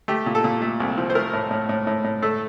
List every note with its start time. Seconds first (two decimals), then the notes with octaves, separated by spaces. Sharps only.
0.08 A3 G4
0.26 A#2
0.35 A4
0.44 A#2
0.62 A3
0.80 C2
0.97 F3
1.10 C5
1.15 A3 A#4
1.33 A2
1.51 A2
1.69 A2
1.87 A2
2.04 A2
2.23 A3 A4